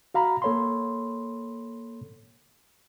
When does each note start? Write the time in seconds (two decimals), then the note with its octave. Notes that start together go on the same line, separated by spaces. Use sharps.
0.14 F#4 F5 A#5 B5
0.42 A#3 A4 C#5 B5 C6